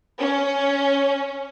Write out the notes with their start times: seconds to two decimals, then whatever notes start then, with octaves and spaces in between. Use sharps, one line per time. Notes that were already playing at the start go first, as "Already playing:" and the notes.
0.19 C#4